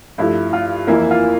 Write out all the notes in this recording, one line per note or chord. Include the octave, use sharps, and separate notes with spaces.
G2 F3 A3 E4
F4
F2 E3 A#3 E4
F4